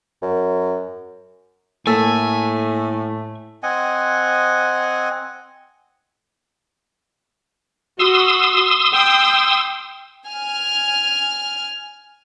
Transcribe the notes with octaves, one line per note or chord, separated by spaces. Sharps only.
F#2
A2 A3 A#3 G#5 E6
C4 D#5 F#5 G#5
F#4 C6 D#6 E6
G5
G#5 F6